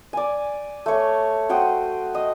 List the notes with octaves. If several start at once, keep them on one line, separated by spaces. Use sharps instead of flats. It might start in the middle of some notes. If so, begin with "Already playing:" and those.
D5 G#5
A3 C#5
F#4 C5 G5 D#6
D#5